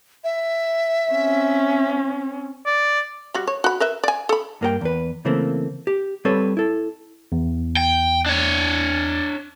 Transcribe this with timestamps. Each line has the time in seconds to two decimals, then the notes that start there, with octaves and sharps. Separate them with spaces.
0.24 E5
1.11 C4 C#4
2.66 D5
3.34 G3 F#4
3.47 C#5
3.64 F#4 B5
3.80 A#4 B4 E5
4.03 D5 G#5
4.29 A4 B5
4.61 G2 A#3 G4 G5
4.81 E2 B4
5.25 C#3 E3 A3 A#3 C4
5.87 G4
6.25 G3 C4 A4 B4 C#5
6.57 E4 A4
7.32 E2
7.77 G5
8.26 D4 C#5